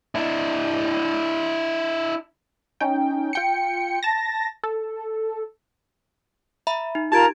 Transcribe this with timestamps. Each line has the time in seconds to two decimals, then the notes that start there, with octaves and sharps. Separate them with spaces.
0.15 D4 E4
2.80 C#4 D#4 G5
3.33 F4 G5 C#7
4.03 A5 A6 A#6
4.64 A4
6.67 E5 A#5 B5
6.95 D#4
7.12 F4 G4 A#4 A5 A#5 G#6 D7